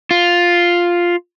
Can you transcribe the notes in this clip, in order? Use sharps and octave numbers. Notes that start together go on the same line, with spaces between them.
F4